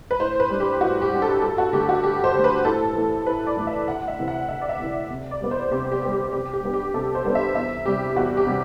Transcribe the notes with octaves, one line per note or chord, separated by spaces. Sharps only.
B4
A2 C5
B4
G3 D4
G4
A2 F#4
G4
G3 D4
A4
G2 A4
F#4
D3 A3 G4
F#4
G2 G4
C5
D3 A3
B4
A2 A4
E3 A3
A2 B4
D5
E3 A3
E5
D2 F#5
E5
C3 E3
F#5
D2 E5
D5
E5
C3 E3
C3
D5
G3 B3
C5
C3 G4
G4
G3 B3
G4
C3 G4
G4
G3 B3 D4
G4
C3 A4
C5
G3 B3 D4
E5
E2 E5
C3 G3 G4
E2 F#4
G4
C3 G3